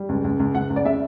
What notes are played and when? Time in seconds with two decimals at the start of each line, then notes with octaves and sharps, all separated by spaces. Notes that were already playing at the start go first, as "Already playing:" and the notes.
Already playing: G3
0.09 C#2
0.24 C#2
0.40 C#2
0.55 C#2 F#5
0.70 C#2
0.76 D5
0.85 C#3 E5